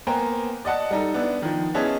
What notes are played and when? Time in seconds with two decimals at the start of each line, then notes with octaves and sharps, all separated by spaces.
0.07 A#3 B3 C5 G5 G#5 A#5
0.65 D5 D#5 F#5 A5
0.90 G3 D#4 A4
1.14 B3 D4 E4
1.42 D#3 F3
1.74 B3 C#4 E4 G#4 D#5 A5